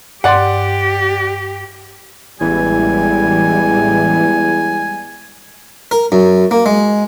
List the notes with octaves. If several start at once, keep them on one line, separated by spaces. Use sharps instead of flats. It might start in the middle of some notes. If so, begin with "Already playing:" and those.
G2 G4 D5 F#5 C6
A1 E2 E3 G3 G#3 G#5
A#4
F#2
A#3
G#3